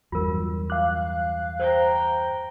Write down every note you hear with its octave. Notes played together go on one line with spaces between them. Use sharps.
E2 G2 F#3 F4 A#4
F5 D6 F#6
C5 G5 A#5